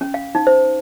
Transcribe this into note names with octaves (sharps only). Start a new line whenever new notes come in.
C#4
F5
D#4
C5